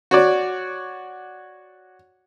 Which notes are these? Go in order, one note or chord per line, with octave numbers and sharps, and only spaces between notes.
F#4 C#5 D5